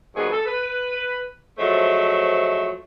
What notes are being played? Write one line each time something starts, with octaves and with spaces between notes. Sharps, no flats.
G2 B2 D#3 F3 B3 G#4
A4
B4
F3 F#3 G#3 A3 C5 E5